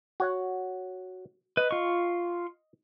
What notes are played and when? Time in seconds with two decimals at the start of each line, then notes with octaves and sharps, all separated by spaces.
0.20 F#4 C#5 F#5
1.57 B4 D#5
1.71 F4 C#6